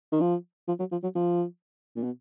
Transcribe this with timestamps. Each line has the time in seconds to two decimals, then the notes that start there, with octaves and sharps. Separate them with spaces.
0.12 D#3
0.21 F3
0.68 F3
0.79 F#3
0.92 F3
1.03 F#3
1.15 F3
1.96 A#2
2.03 B2